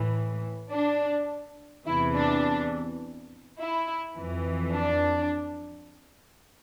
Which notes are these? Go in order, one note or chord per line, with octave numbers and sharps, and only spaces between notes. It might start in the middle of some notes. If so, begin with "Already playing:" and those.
Already playing: A2 E3
D4
E2 C3 E3 E4
D4
E4
F2 E3
D4